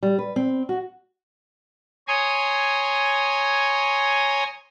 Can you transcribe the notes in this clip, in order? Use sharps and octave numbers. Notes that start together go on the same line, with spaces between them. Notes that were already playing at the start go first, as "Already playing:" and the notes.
G3
B4
C4
F#4
C#5 G#5 A#5 C6 D#6